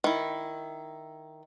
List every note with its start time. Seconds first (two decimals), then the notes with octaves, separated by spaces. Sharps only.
0.04 D#3 E4